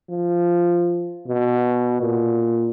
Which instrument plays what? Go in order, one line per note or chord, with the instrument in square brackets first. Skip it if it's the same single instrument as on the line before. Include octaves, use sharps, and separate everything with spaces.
[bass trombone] F3
B2
A#2